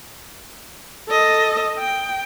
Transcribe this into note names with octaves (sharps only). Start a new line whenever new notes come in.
A4 D#5
G5